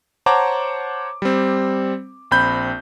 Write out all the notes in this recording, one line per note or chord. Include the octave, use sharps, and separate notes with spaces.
C5 C#5 F#5 A5 A#5 D6
G3 C4
A#1 C4 B5 G6